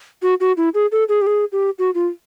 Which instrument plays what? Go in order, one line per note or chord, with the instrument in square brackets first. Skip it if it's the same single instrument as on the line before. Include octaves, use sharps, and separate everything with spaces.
[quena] F#4
F#4
E4
G#4
A4
G#4
G4
G#4
G4
F#4
F4